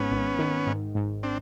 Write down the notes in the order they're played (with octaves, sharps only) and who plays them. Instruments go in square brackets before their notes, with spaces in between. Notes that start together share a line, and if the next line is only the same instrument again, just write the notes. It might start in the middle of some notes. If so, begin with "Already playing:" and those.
Already playing: [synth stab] G#1 G#2 [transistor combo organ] B3 C#4
[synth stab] G#1
D#3
G#2
G#2
[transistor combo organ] C4 D4